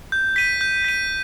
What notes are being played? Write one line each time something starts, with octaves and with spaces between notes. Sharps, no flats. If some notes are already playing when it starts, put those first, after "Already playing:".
G6
B6 D#7
G6
B6 D#7